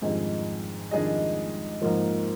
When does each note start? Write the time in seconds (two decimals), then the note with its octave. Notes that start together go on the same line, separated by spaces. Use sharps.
0.02 F2 G#2 D#3 G3 D4 G#4 D#5
0.91 F2 D#3 G3 D4 G#4 D#5
1.82 G#2 F3 A#3